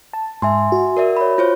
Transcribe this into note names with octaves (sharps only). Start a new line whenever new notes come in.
A5
G#2 E5 G#5 C6
F#4
A#4 D5 E5
C#5 B5
F4 C5 C#5